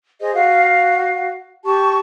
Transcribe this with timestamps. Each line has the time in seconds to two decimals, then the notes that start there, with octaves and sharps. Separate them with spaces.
0.20 G#4 C5 D#5
0.35 F#4 F5
1.64 G4 A5 C#6